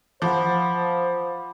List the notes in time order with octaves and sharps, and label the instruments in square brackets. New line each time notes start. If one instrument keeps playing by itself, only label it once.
[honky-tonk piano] F3 [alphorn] C5 [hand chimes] F#5 B5 D6